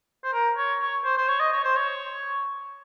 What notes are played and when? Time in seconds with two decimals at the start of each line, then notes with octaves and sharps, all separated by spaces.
0.25 C5
0.33 A#4
0.57 C#5
0.81 C#5
1.05 C5
1.18 C5
1.29 C#5
1.40 D#5
1.52 C#5
1.64 C5
1.76 C#5